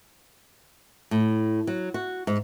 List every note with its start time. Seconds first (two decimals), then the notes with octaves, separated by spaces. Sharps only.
1.11 A2
1.67 F#3
1.94 F#4
2.27 G#2